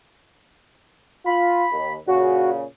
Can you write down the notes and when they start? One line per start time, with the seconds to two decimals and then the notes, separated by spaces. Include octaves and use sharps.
1.26 F4 B5
1.72 D#2
2.07 A#2 C#3 F#4